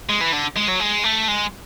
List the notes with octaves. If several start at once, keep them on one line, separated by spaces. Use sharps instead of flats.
G#3
E3
D3
G#3
F#3
G#3
A3
G#3